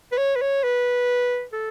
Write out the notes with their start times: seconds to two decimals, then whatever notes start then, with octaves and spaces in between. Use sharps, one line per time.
0.12 B4
0.18 C#5
0.36 B4
0.42 C#5
0.63 B4
1.53 A4